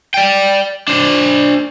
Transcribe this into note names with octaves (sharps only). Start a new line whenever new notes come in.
D5 G5
D4 C5